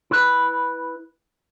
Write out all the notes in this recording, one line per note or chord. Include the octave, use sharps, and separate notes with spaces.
E4 B4 B5